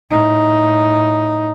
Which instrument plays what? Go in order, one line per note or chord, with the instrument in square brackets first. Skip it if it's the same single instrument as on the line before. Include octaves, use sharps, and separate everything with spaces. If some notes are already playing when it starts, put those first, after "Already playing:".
[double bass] A2 D#4